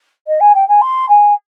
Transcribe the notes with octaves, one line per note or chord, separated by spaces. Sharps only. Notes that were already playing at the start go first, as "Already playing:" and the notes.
D#5
G#5
G5
G#5
C6
G#5